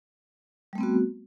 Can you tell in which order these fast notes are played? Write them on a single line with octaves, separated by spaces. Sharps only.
G3 A3 C4 B3 F#4